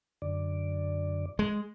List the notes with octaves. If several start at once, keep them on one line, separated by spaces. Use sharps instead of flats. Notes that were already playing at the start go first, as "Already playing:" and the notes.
F#2 D3 D5
G#3